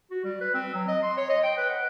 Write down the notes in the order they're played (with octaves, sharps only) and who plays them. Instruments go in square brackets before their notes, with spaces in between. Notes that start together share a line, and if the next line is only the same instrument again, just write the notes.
[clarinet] F#4
G3
B4
C4
F#3
D#5
C6
C#5
D#5
G5
B4
F#5